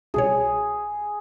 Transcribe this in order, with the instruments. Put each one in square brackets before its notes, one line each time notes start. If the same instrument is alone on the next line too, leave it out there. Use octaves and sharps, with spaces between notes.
[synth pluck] C2 B2 C#5 [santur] G#4